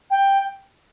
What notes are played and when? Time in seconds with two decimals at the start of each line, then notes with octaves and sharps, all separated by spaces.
0.10 G5